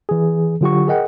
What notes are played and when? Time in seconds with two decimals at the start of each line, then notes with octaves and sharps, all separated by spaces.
0.09 E3 G#4
0.61 D3 F#3 F4 G4 F#5 C#6
0.87 G#4 A#4 D#5 F#5 G5